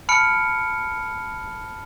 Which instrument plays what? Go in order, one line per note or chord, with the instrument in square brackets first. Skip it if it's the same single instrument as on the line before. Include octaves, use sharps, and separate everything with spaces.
[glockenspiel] A5 B5 F6 C#7 D7